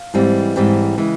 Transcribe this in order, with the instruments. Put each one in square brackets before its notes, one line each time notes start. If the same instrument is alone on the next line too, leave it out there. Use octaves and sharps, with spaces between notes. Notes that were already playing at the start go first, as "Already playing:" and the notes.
Already playing: [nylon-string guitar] F5
G#2 E3 G3 C4
G#2 E3 G3 C4 G5
C#3 E3 G#3